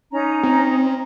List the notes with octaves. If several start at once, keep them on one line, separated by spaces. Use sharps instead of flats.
C#4 D#4 A#5
C4